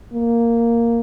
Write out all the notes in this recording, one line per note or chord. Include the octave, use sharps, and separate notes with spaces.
A#3